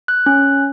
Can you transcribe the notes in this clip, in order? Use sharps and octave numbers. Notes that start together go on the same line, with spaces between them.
F#6
C#4 F#6